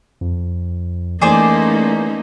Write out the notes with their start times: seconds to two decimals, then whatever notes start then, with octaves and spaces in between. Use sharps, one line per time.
0.21 F2
1.22 E3 A3 A#3 C#4 D#4 G#4 C5 D5